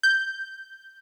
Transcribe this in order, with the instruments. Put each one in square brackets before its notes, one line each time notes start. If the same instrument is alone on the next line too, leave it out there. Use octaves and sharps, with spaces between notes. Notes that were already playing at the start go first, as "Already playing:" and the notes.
[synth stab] G6